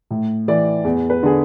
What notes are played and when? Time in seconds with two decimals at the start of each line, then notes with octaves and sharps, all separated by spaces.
0.10 A2
0.48 E3 D5
0.84 E2
1.10 B4
1.23 D3 G#4